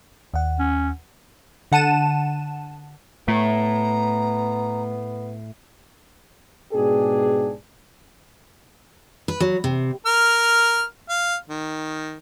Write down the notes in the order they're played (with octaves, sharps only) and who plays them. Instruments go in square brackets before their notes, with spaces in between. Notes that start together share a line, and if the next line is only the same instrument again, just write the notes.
[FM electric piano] D#2 F#5
[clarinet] C#4
[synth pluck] D3 F#5 A5 D#7 E7
[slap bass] A2 [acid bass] A3 [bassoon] B3 [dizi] A#5
[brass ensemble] G#2 B2 D4 G4 G#4
[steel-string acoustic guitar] B4
F#3
C3
[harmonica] A#4 F6
F5
D#3